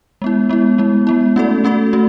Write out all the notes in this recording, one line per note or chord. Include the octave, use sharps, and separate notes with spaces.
G#3 B3 E4
G#3 B3 E4
G#3 B3 E4
G#3 B3 E4
A3 C#4 F#4 A4 D5
A3 C#4 F#4 A4 D5
A3 C#4 F#4